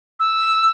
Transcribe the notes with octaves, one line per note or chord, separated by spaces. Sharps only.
E6